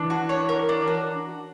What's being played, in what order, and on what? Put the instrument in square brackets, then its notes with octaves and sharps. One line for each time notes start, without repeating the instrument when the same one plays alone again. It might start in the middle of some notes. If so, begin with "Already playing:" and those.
Already playing: [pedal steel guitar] E3 [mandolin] D4
[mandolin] F#4
C#5
A#4
D4
F#4